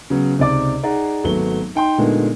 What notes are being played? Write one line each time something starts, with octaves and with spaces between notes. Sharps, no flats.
C#3 F#3 B3
C#2 C3 D#4 D5 D6
D#4 G#4 D5 F#5 A#5
G#1 F#3 A3 B3 G7
D#4 G5 C6
A#2 D3 G#3 A3 B3 D#4